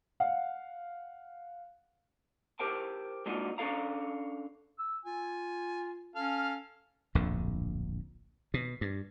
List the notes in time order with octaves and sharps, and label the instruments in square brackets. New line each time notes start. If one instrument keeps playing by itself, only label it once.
[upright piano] F5 F#5
[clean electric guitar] G4 A#4 C5 G5 A5
G#3 A#3 D4 D#4 F4 F#4
C#4 D4 A4 F5 A#5
[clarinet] E6
[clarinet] F4 [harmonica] G#5
[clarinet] C#4 [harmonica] A4 F5 F6
[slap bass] D1 A#1 F2 D3
B2
G2